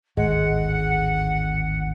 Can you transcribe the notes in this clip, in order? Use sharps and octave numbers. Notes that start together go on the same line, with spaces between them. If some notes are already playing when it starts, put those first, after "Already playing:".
G#1 D2 A2 G#3 F#5